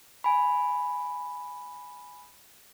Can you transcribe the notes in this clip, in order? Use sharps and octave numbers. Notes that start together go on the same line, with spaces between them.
G#5 B5